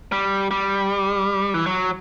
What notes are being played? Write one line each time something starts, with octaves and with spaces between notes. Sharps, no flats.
G3
G3
E3
F#3